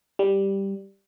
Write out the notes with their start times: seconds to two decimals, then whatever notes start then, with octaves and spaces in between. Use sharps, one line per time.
0.19 G3